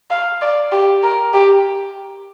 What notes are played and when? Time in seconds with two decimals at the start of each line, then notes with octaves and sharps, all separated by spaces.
0.10 F5
0.41 D5
0.72 G4
1.03 A#4
1.34 G4